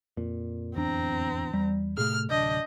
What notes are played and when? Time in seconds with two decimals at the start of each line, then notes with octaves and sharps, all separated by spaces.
0.17 F2 A#2
0.75 D1 E2 C4 D4 A#5
1.54 E2 G3
1.98 A2 C3 A3 G#4 F6
2.30 D1 D4 D#5 G6